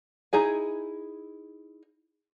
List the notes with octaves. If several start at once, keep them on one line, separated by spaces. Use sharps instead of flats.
D#4 E4 G#4 G#5